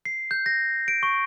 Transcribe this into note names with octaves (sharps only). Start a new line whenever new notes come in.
C7
G6
A#6
D7
C#6